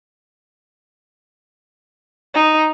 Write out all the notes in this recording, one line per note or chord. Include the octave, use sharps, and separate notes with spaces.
D#4